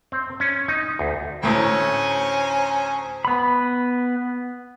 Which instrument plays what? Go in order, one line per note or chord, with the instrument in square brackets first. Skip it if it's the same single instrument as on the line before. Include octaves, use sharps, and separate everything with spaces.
[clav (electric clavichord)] C4
C#4
D#4
D2
[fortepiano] D2 A2 [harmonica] C#4 C5 G#5 [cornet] A#5
[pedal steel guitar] B3 B5